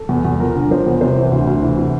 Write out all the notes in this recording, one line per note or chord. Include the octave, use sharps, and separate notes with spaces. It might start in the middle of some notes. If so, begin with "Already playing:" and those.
Already playing: A4
E2
E2
F3 A#4
D3
F3 C5
E2
C3 C5
E3
D2
D2
E3
C3